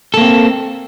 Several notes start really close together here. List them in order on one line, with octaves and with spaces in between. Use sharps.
A4 A#3 C4